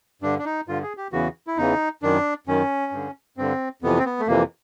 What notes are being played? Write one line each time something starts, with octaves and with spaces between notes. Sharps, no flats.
G2 D3 D4
D4
D#4
G2 D3 F4
G#4
G4
E2 C#3 E3 F#4
E4
E2 C#3 E3 D#4
F#2 D#3 D4
F#2 D#3 C#4
G2 D3
G2 D3 C4
F2 C3 E3 B3
C4
B3
A3
F2 C3 E3 A#3